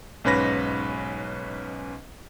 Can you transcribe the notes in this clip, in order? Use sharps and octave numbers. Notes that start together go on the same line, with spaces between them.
B1 G#2 C#4 B4 B5 A#6